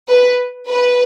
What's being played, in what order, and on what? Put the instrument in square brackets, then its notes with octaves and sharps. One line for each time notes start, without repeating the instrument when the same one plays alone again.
[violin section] B4
B4